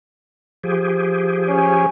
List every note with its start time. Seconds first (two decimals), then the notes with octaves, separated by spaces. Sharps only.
0.64 F3 G4 G#4
1.48 C#4